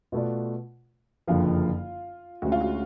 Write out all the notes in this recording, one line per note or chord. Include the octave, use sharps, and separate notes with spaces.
B2 A3 F4 B4 D5
F#1 F2 D3 F3 F4
D2 D3 G#3 C#4 F#4
F4
F#4